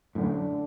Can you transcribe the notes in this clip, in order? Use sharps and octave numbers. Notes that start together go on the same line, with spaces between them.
F#2 A2 D3